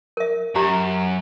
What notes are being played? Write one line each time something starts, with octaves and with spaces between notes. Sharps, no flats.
A#4 E5
F#2 G4 A#5